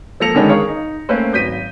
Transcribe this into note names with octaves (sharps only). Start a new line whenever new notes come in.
F3 A#3 A4 A#6 C#7 F7
D3 D#3 G#3 B3 C#4 D4
G#4 A#4 C#5 F5 C#6
D#4
A3 A#3 C4 C#4 B4 C5
G#1 F#3 G6 A#6 B6 D#7